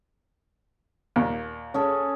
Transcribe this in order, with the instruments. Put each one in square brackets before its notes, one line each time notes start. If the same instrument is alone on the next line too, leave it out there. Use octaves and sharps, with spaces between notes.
[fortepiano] D#2 A#2
[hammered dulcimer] C#4 G#4 A4